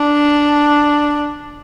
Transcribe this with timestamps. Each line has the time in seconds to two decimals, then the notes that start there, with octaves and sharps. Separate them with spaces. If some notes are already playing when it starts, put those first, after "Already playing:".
Already playing: D4